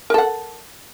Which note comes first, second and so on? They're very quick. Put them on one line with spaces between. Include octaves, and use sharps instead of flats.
A#4 A4 F#5